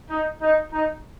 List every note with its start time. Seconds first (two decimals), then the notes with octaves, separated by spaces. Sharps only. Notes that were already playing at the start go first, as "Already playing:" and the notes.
0.09 D#4
0.42 D#4
0.73 D#4